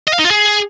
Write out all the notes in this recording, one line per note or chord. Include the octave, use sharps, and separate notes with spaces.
D#5
F5
D#4
F4
G#4